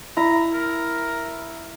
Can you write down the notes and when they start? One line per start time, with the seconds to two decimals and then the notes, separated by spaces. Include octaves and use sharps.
0.17 E4 A#5
0.54 A#4